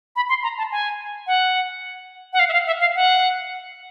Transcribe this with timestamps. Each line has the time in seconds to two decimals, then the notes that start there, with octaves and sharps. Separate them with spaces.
0.16 B5
0.29 C6
0.43 A#5
0.58 A5
0.72 G#5
1.27 F#5
2.33 F#5
2.39 F5
2.49 E5
2.53 F5
2.67 E5
2.80 F5
2.95 F#5